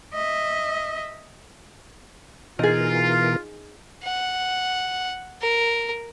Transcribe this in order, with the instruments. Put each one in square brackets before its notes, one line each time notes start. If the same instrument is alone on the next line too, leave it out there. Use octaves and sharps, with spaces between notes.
[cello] D#5 E5
[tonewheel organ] B2 E3 A#4 [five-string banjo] D#4 G#4 [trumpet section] F4
[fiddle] F#5
A#4